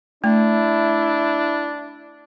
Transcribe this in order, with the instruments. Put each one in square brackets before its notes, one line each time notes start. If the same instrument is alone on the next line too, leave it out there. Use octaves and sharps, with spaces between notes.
[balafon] A3 [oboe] D4 [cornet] E4